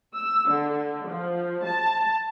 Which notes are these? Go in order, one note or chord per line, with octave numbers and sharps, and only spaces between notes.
E6
D3
F3
A5